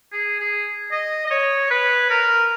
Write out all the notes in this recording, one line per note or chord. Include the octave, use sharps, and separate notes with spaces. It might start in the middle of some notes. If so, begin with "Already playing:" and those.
G#4
G#4
D#5
D#5
C#5
B4
A#4